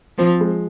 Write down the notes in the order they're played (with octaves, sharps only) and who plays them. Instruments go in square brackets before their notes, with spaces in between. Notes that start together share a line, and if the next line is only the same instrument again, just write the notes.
[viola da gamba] F3 [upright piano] C4
[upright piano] G#3